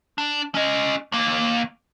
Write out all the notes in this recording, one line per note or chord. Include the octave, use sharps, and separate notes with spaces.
D4
C#4 D#5
D#2 A#3